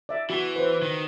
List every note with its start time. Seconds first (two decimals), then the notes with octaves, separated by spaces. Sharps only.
0.09 D5 E5
0.30 E3 F#4
0.56 B4 C5
0.82 D#3